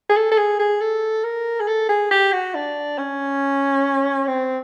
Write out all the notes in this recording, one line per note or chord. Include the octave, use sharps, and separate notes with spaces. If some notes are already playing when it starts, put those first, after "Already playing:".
G#4
A4
A4
G#4
G#4
A4
A#4
G#4
A4
G#4
G4
F#4
D4
C#4
C4